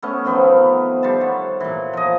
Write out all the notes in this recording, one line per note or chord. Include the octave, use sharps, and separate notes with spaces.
A3 B3 C#4
D#3 F3 B3 C4
G3 C5 A5
C#5 F#5
A#2 E3
F3 D#5